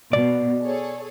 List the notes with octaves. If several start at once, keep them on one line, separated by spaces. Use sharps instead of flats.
B2 D5
G#4 A4 C#5